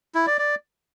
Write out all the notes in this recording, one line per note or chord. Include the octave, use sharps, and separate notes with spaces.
E4
D5
D5